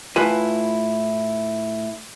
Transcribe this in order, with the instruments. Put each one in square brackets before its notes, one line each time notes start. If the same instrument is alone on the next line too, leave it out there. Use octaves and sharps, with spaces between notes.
[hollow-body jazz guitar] A2 E4 F4 B4 G#5